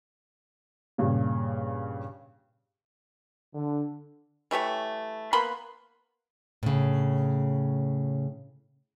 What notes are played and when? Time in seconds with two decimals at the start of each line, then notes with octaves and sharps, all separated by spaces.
0.98 G2 A#2 C#3
3.54 D3
4.51 E3 A3 G4 C#5
5.33 A#3 B3 B5 C6
6.63 A2 C#3